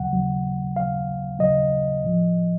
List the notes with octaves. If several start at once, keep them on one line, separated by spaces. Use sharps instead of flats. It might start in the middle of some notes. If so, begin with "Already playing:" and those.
Already playing: D#2 C#3 F#3 F#5
D#2 C#3 F#3
D#2 C#3 F#3 F5
D#2 C#3 F#3 D#5
A2 F3